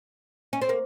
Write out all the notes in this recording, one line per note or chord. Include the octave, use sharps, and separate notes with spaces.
C#4
C4
A#3